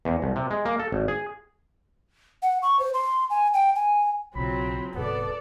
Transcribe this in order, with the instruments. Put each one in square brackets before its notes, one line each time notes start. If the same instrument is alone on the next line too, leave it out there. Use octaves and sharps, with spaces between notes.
[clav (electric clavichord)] E2
C2
C3
G#3
A#3
A4
G#1
G#4
[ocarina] F#5
C#6
C5
C6
G#5
G5
G#5
[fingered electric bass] B1 C#3 [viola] F#3 C4 [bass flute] F4 [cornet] B5
[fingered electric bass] D1 G#2 C3 [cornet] B3 [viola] A4 D5 [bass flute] B4